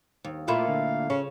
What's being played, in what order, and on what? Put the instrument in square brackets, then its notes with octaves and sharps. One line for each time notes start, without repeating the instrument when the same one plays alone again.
[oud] D#2
[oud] A#2 A3 E4 [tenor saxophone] F4 [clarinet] F5
[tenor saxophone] D3
[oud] C#3 [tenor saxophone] C#4